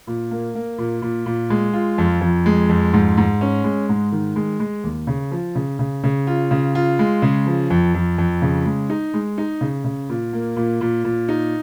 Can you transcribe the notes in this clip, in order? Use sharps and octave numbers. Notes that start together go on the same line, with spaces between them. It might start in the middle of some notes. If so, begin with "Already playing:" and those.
A#2
A#3
A#3
A#2
A#2
A#2
G#3
F4
F2
F2
G#3
F2
G#2
G#2
C#4
G#3
G#2
D#3
G#3
G#3
D#2
C#3
F3
C#3
C#3
C#3
F4
C#3
F4
G#3
C#3
F3
F2
F2
F2
C#3
G#3
D#4
G#3
D#4
C#3
C#3
A#2
A#3
A#2
A#2
A#2
D#4